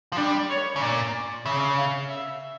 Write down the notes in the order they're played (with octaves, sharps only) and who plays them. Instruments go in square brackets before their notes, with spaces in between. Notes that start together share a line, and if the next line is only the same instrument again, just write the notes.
[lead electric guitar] F3
[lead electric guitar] G3 [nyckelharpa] D4
[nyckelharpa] C#5
[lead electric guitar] C#3
[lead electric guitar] A#2 [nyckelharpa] D5
[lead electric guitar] C#3 [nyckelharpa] E5
[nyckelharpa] F5
E5